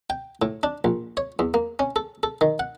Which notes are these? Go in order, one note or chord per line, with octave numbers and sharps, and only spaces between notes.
G5
A2
D4
A#1
C#5
E2
A#3
C#4
A4
A4
D#3
F#5